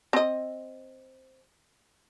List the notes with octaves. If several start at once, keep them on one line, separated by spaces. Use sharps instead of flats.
C4 D#5